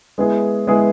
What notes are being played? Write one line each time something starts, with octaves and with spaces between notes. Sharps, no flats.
G#3 B3 E4 G#4
G#3 B3 E4 G#4